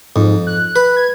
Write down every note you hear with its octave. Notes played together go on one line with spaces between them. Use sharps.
F2 G#2
F#6
B4
G#6